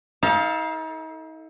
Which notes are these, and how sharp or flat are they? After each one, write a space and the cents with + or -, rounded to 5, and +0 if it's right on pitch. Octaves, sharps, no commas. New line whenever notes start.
D#4 +40 A4 +0 F5 +0